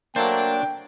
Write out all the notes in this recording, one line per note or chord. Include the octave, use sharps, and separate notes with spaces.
F#3 A3 A#3 D4 C5 G5